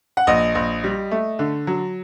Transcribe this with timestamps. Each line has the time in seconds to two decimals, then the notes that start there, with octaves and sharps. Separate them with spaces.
0.17 F#5
0.27 A#1 D#5
0.55 A#1
0.84 G3
1.11 A3
1.39 D3
1.67 F#3